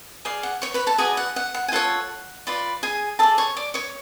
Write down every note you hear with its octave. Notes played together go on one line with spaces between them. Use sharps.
G#4 D5 F5
F#5
C#5 C#6
B4 B5
A4 A5
F#4 G#4 B4 D5 G#5
F#5
F#5
F#5
G#5
F4 A4 C#5 F#5
F4 B4 D5
G#4 G#5
G#4 A4 D5 A5
C#5 C#6
D5 D6
C#5 C#6